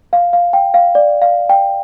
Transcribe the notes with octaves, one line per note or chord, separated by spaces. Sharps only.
F5
F5
G5
F5
D5
F5
G5